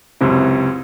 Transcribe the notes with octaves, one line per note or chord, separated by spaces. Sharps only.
C#2 F#2 C3 C4 E4